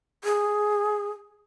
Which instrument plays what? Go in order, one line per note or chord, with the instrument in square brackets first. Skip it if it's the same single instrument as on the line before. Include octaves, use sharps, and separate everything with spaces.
[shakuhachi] G#4